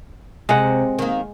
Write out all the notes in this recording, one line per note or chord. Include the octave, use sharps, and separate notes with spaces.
C3 G#3 F#5
D#3 A#3